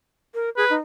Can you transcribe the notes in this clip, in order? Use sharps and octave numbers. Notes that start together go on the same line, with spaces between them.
A#4
G#4 B4
D#4